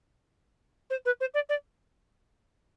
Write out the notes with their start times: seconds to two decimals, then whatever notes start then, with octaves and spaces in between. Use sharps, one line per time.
0.90 C5
1.05 B4
1.20 C5
1.34 D5
1.49 D5